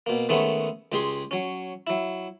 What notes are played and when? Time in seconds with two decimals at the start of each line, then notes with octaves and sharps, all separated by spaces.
0.06 B2 A#3
0.29 D#3 G#3 A3 B3 C#4
0.92 C#2 G#3 G4 G#4 C6
1.31 F#3 C#4
1.87 F#3 E4